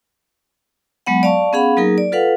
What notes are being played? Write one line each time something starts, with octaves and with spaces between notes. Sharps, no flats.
F#3 G#3 B3 F#5
D5 F5 A5 C#6
B3 C#4 G#4 F5 F#5 B5
F#3 A#3 D#4 G#4 A#4
D5
F4 A4 B4 F5 F#5